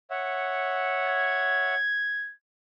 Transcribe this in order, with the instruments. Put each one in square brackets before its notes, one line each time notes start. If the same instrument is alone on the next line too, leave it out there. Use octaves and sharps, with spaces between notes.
[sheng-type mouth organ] C#5 E5 F#5
[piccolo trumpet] G#6